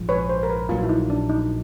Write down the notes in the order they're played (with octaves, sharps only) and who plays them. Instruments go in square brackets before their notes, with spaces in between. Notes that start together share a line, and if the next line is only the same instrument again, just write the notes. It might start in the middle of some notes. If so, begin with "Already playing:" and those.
Already playing: [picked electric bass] A#1 G#2 F3
[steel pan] B4 C#5
C5
A#4
B4
[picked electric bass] A#1 A#2 F#3 [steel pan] F4
[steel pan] E4
D#4
D4
D#4